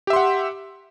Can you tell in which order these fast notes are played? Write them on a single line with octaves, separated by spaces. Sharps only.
G4 E5 C6 F#5